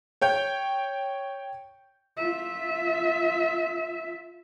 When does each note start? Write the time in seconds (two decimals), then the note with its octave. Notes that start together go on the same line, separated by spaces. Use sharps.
0.22 C#5 G5 G6
2.17 F4 E5